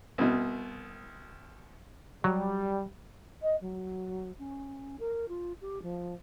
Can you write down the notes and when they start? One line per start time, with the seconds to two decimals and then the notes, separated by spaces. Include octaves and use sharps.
0.18 C2 B2
2.24 F#3 G3
3.42 D#5
3.61 F#3
4.39 C#4
5.00 A#4
5.29 F4
5.62 G4
5.82 F3